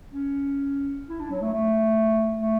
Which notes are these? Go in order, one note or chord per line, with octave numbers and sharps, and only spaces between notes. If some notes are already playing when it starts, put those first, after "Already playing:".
C#4
E4
D4
F#3
A3
A3
A3